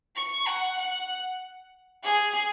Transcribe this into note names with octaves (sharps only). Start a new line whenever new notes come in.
C#6
F#5
F#5
G#4